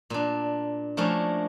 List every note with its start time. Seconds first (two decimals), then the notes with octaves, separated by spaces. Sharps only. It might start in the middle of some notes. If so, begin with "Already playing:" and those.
0.10 A#2 D4
0.97 F3 A3 A#3 C#4 D4 E4